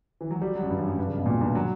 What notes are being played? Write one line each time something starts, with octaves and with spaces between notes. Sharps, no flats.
E3
F#3
G3
F#3
F#2
G2
F#2
F#2
G2
C#3
B2
A#2
G2
F#3